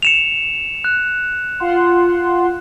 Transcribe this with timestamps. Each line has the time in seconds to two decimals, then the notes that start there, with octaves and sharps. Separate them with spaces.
0.02 C#7 E7 F7
0.84 F#6
1.60 F4 F#5 C6